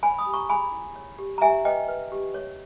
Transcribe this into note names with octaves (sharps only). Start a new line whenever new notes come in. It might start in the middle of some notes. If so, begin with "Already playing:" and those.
C#5 G#5 B5
B5 D#6
G4
A#5 C#6
G#4 G#5 B5
E4
C#5
G4
A#5
G4 E5 G#5
B4 D#5 G5
B4
G4
C#5